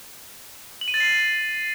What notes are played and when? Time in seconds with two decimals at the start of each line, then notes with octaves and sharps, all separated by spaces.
0.81 F#7
0.88 D#7
0.94 A6
1.00 C7